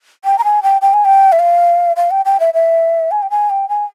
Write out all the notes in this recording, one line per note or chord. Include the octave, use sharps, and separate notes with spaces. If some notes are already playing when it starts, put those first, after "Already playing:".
G5
A#5
G#5
G5
G5
G#5
G5
E5
F5
F5
G5
G5
E5
E5
G#5
G5
G#5
G5
G#5